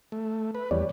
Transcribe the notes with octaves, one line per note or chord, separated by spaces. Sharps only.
A3
B4
E2 G3 C#5 D5